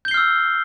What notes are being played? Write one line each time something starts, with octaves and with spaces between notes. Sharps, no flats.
E6 F6 G6 C7 G7